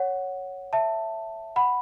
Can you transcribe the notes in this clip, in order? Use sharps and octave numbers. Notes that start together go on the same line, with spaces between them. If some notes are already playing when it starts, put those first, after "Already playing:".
Already playing: C#5 F#5
E5 A5
F#5 B5